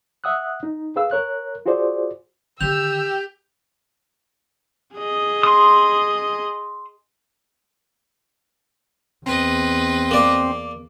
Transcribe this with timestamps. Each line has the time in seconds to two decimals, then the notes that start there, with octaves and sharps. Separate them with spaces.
0.24 E5 F#5 D#6 E6 F#6
0.63 D#4
0.96 G#4 B4 F5 E6
1.11 A#4 C#5 F#6
1.66 F4 F#4 G#4 C5 D5
2.61 D3 D#3 G4 E6 G6 F7
4.96 G#4 D#5
5.43 C6 D#6
9.26 E2 C4 B4 D#5
10.11 A#3 D5